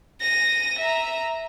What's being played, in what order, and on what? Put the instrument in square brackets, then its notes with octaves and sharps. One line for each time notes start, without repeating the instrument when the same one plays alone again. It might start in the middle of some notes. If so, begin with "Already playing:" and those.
[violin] A#6 D#7
E5 A#5